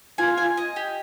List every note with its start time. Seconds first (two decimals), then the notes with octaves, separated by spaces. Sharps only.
0.18 F4 G#5
0.37 G#5
0.57 D#5
0.76 G4